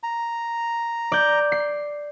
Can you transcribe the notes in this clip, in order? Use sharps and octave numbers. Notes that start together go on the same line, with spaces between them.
A#5
D5 G6
C7